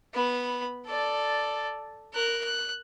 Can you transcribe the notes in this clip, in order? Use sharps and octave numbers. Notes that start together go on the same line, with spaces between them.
B3 B5
A4 D5
A#4 F#6
F#6